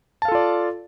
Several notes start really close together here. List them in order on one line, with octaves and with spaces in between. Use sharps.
A5 F5 A4 F4 D5